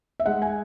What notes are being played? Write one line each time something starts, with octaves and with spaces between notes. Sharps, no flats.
E5
G#3 F#5
G#5